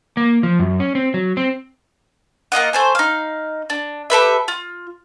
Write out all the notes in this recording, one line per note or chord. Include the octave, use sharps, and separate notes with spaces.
A#3
F3
F#2
C#4
C4
F#3
C4
A#3 F4 D#5 F#5
A3 C5 G#5
D#4 F5
D4
G4 A4 B4 E5
F4